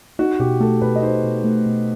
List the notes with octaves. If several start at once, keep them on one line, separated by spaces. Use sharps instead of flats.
D#4 F#4
B2 G4
A3 A4
B2 B4
D#5
D#4 C5
B2
A3
B2